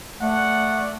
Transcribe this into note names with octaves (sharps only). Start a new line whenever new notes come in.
A3 D5 F#5